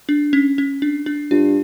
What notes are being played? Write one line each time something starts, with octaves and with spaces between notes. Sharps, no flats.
D4
C#4
C#4
D4
D4
G2 F4